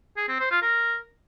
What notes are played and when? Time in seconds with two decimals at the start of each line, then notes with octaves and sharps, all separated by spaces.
0.17 G#4
0.28 C4
0.40 C5
0.51 F4
0.62 A#4